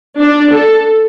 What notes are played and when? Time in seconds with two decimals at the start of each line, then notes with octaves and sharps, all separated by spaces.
0.19 D4
0.52 A4